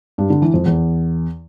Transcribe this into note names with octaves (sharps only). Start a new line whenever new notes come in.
G2
D3
E3
F2
E2